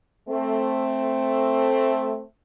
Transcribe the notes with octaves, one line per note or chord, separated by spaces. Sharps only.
A3 C4